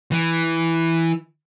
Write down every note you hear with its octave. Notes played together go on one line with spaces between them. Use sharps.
E3